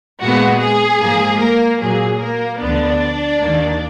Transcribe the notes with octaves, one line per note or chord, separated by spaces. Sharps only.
A#2 G#3 B3 F#4
G#4
G#2 F3 A#3
A#3 A#4
A#2 F#3 A#3 G#4
A#3 A#4
D2 D3 F3 B3 D4 D5
D#2 D#3 A#3